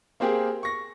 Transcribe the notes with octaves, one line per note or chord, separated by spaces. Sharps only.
A#3 C4 G4 G#4 A#4
C#6 A#6